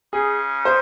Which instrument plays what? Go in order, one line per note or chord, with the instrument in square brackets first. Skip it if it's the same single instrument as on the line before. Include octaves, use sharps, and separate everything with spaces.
[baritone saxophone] C#3 [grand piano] G#4
[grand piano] C5